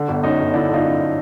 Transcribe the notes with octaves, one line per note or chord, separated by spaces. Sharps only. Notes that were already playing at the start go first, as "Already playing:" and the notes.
Already playing: D3
G1
F#2 C#4 D#4
G1
D3 D4 E4
G1 D#4 F4
F#2